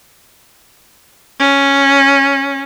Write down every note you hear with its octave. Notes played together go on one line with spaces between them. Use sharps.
C#4